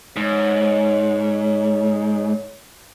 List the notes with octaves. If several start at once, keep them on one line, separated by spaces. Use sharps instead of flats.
G#2 C#5